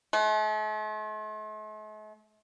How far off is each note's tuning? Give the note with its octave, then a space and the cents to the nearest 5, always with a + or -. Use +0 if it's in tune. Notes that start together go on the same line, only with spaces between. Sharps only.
A3 -45